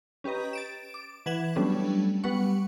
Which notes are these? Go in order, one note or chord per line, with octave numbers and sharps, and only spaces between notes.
C#4 G4 B4 D#5 A#5
A6 D7 E7
D6
E3 B4 F#5 G#6 E7 F#7
F#3 G3 A3 B3 C#4 D4
G3 B3 B4 F#5 C#6